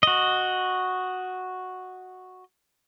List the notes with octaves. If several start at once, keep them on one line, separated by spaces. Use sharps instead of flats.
F#4 D#5